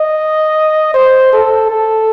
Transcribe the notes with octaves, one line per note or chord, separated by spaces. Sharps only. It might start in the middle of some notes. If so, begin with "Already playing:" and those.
Already playing: D#5
C5
A4
A4